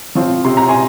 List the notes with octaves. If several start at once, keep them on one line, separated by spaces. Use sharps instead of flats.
F3 C4 F4
C3 C6
A#5
G#5 C6